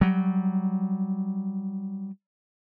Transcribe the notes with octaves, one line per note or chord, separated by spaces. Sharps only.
F#3 G3